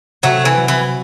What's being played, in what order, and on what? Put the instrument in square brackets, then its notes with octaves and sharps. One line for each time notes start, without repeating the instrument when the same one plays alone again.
[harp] C3 [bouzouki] F#3 A3
[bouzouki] E3
[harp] F#3
[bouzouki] E3